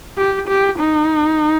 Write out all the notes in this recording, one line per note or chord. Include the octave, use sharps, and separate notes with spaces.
G4
G4
D#4